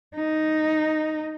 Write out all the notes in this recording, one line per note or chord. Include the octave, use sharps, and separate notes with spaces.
D#4